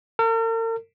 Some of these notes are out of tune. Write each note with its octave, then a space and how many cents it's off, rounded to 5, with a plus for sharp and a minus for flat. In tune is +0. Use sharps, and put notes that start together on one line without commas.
A#4 -45